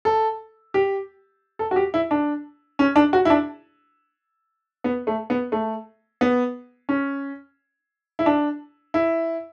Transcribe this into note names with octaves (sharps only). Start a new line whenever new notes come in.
A4
G4
A4
F#4
G4
E4
D4
C#4
D4
F#4
E4
D4
B3
A3
B3
A3
B3
C#4
E4
D4
E4